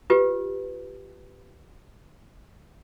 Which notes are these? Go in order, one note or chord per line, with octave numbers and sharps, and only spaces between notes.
F4 G4 B4